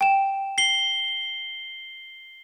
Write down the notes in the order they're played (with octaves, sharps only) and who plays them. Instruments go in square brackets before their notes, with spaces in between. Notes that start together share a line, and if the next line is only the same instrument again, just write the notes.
[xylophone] G5 E7
[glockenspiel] C7 G7